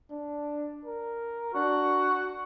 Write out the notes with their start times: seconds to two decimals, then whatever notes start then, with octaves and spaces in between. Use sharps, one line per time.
0.11 D4
0.85 A#4
1.54 D4 F#4